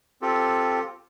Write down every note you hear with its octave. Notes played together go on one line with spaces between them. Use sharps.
C4 F4 G4 A4